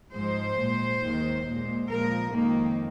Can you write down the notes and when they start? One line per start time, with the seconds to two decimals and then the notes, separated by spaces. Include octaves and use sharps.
0.13 G#2 F3 G#3 C5
0.57 A#2 G#3
1.01 D#2 D#3 G#3
1.46 A#2 G#3
1.90 A#2 F3 G#3 A#4
2.34 F2 D#3 G#3 A#3